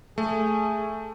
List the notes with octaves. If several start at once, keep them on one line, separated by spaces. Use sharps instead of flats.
A3 G#4